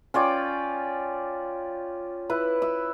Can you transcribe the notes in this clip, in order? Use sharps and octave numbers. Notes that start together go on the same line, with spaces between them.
C#4 F4 D5 G5
E4 B4
E5